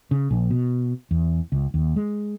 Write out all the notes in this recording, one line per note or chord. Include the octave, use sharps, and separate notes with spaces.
C#3
A#1
B2
E2
C#2
D#2
G#3